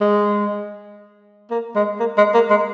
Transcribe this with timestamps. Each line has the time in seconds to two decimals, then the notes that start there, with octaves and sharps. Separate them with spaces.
0.01 G#3
1.51 A#3
1.75 G#3
2.00 A#3
2.18 G#3
2.34 A#3
2.50 G#3